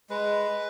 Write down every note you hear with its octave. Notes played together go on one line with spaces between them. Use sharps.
G#3 B4